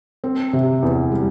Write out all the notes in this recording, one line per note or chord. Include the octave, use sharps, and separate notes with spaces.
C4
C3
E2
G3